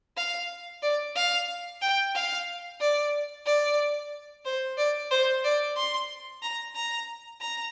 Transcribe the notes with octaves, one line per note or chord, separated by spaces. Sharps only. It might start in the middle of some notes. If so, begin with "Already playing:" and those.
F5
D5
F5
G5
F5
D5
D5
C5
D5
C5
D5
C6
A#5
A#5
A#5